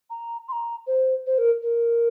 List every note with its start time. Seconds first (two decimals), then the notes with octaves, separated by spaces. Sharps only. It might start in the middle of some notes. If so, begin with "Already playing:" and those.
0.10 A#5
0.48 C6
0.52 A#5
0.87 C5
1.27 C5
1.38 A#4
1.62 A#4